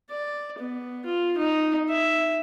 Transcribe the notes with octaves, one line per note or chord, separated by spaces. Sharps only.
D5
B3
F4
D#4
E5